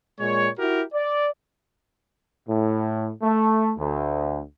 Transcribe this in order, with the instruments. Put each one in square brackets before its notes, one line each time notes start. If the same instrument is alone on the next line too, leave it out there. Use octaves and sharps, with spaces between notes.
[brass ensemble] A#2 G#3 C#5
E4 F#4 G4 A#4
D5
[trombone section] A2
A3
D2